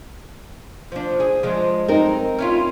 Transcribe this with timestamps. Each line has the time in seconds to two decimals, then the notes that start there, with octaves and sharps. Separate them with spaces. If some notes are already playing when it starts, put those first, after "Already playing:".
0.92 F3 D4
1.20 G#4
1.43 F3 G#3 D4
1.88 C4 D#4 A#4
2.39 C#4 E4 F4